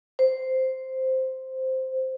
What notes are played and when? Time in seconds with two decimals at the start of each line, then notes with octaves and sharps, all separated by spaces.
0.19 C5